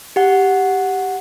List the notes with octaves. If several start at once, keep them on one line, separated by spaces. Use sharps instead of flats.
G4 F#5